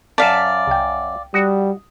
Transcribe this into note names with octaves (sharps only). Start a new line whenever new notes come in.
F#2 D5 E5 F5 A5
C2 G5
G3 F#4 D#6